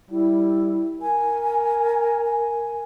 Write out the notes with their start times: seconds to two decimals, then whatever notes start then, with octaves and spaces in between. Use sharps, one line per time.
0.11 G3 E4
1.02 A#4 G#5
2.26 G#5